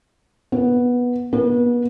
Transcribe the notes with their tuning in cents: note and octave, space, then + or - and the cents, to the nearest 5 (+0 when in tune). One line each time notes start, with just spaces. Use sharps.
B3 -10
B3 -35